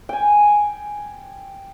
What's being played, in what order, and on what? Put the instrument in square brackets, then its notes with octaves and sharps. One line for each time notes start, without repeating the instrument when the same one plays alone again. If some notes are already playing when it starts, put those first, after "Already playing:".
[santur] G5 G#5